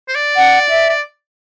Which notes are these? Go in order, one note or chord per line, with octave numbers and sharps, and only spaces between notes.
C5
D5
F#5
E5
D5